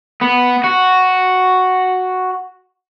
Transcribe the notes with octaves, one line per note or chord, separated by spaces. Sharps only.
B3
F#4